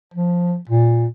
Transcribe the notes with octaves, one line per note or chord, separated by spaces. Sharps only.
F3
A#2